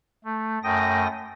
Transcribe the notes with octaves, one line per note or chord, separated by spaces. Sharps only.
A3
F#2 A3 G5 D#6 A#6